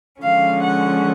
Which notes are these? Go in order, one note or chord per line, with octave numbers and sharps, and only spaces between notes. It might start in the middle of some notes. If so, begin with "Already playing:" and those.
D3 F3 G#3 C#4 F5
F#5